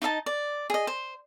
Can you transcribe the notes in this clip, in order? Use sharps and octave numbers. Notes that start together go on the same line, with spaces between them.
D#4 D#5 E5 A5
D5
G#4 D#5
C5